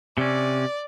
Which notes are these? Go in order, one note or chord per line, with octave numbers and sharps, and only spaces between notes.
C3 C#4 D5